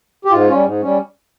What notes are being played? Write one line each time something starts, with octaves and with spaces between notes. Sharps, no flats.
G4
G#2 F4
G3 C#4
G#2
G3 C#4